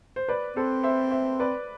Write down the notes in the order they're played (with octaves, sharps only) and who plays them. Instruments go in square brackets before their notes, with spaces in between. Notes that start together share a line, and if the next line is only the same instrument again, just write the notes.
[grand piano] C5
B4 D5
[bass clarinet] C4 [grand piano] A4 C5
[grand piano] C5 E5
C5 E5
B4 D5